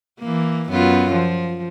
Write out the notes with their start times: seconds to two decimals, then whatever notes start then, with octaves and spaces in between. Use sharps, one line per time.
0.20 E3 A#3
0.70 F#2 B3 F4
1.12 F3